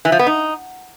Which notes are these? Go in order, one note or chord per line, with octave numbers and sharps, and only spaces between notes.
E3
F3
B3
D#4